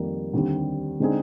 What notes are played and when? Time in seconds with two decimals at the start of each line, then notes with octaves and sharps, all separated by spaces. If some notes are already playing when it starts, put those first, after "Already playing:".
Already playing: F2 D#3 G3 A#3
0.33 D#2 D3 G3 C4
1.00 D3 G#3 C4 D#4 G#4